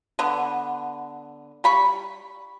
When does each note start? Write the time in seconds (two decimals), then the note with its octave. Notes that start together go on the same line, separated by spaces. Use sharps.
0.19 D3 B3
1.64 G3 B5 C#6